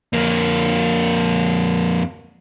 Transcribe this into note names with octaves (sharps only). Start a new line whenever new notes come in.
F2 A#3